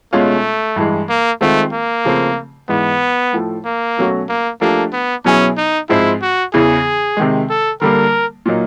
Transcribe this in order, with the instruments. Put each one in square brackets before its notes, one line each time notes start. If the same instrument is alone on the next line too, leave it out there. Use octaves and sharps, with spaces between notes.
[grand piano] B2 G#3 C#4 F4 [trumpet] A3
[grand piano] G2 E3 G#3
[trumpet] A#3
[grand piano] D#3 G#3 C4 F4 [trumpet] A3
[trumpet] A#3
[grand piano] C#3 F3 A3 C4
[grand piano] G#2 E3 G#3 [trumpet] B3
[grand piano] A2 F3 A3
[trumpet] A#3
[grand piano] B2 F#3 A3 C#4 F#4
[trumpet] A#3
[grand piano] F3 A3 D4 G4 [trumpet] A#3
[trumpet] B3
[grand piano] B2 F#3 B3 E4 G#4 [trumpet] C#4
[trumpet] D#4
[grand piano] G#2 F3 G#3 C4 [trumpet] E4
[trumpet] F#4
[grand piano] E2 C#3 E3 [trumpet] G#4
[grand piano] C3 D#3 G#3
[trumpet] A4
[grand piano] D3 G3 A#3 [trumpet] A#4
[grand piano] A#2 F#3 A#3 D#4